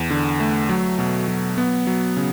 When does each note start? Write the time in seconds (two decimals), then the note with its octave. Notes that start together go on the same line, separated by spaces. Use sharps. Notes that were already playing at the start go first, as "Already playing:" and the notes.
Already playing: E2
0.10 D3
0.40 A3
0.69 F#3
0.99 B2
1.28 F#3
1.58 B3
1.87 F#3
2.17 C#3